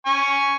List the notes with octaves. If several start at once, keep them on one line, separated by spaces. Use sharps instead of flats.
G#5 C#6